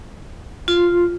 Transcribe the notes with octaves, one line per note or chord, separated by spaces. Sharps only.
F4